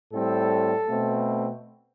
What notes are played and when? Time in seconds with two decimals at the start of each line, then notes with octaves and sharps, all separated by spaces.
0.12 A2 G3 C4 A4
0.89 B2 A3 C4